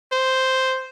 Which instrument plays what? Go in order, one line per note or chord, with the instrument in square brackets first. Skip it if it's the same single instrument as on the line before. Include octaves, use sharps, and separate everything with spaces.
[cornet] C5